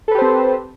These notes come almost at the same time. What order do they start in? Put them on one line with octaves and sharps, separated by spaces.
A4 B4 G4 C5 C4